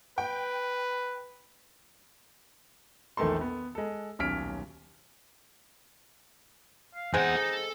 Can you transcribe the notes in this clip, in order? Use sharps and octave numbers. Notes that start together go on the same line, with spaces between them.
B4 G5
A#1 E2 D#3 A3 A4 C6
B3
G#3 A4
D#1 B1 C#4 F6 B6 D7
F5
E2 G#3 C4 D#4 G#4 F#5
A4